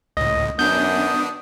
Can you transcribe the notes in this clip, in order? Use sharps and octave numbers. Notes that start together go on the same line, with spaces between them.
C#2 A2 D#5
F#2 D#3 B3 D4 D#6 G6